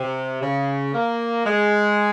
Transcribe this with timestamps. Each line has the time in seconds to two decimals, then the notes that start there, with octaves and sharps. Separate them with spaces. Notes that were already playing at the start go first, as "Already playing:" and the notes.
Already playing: C3
0.41 C#3
0.93 A#3
1.45 G#3